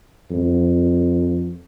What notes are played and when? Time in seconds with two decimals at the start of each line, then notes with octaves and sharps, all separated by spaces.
0.31 F2